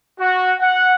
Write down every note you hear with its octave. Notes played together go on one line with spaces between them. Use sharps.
F#4
F#5